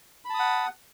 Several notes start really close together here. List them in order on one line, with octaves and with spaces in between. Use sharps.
B5 A5 D#6 F#5